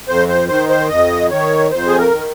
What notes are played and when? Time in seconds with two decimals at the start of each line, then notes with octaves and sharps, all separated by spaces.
0.08 F2 C5
0.29 C5
0.49 D#3 C5
0.69 C5
0.89 F2 D#5
1.30 D#3 C#5
1.71 F2 C5
1.87 G#4
1.98 A#4
2.12 D#3